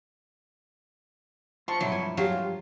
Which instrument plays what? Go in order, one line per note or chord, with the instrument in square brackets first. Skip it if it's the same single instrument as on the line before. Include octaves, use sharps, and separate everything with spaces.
[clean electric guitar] F4 C5 A5 [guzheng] C6 [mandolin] C#6
[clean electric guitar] G2 B2 E4 [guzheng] F#3 C6
[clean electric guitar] G2 F3 [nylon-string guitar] E4 [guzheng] G#5
[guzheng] F#3 [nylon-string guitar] G3 G4 G#4 [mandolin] F4